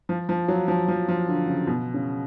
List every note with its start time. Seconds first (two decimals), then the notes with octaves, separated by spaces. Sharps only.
0.09 F3
0.29 F3
0.48 F#3
0.68 F3
0.88 F3
1.09 F3
1.28 D3
1.48 C#3
1.67 B2
1.94 C#3